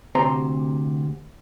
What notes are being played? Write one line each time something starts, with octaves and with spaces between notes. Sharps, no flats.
D2 C3 C5 A#5